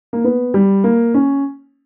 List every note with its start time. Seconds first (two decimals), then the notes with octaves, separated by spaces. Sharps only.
0.13 A#3
0.24 B3
0.54 G3
0.84 A#3
1.14 C#4